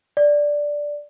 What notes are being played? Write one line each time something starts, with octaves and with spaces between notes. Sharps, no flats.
D5